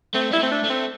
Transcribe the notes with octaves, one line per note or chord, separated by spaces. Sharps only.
A3 C4
G3 E4
A3 C4
D4
A3
C4